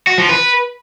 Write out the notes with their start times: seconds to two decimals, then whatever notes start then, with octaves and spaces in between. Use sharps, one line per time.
0.07 F#4
0.18 F3
0.29 B4